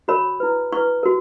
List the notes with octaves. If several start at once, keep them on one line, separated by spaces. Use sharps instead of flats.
F#4 A#4 C#5 B5
E4 B4
E4 B4 C#6
F#4 A#4